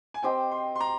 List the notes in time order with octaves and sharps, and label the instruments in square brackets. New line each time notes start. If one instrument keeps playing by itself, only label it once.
[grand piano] G#5
[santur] C4 G4 C5 D#5 [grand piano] G5
[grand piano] C6
C6
A#5